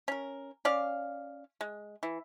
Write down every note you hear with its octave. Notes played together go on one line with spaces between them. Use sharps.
C#4 A#4
C#4 D5 F5
G#3
E3